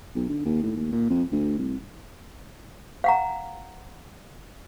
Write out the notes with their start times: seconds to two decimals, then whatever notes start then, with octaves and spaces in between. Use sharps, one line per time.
0.15 B1
0.29 D3
0.45 D#2
0.63 A2
0.76 D#2
0.92 A#2
1.10 F2
1.31 D2
1.58 C2
3.04 F5 F#5 A#5